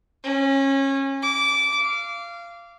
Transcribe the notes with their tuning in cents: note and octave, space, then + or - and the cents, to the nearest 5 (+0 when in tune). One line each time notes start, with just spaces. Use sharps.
C#4 -25
D6 -15
F5 -20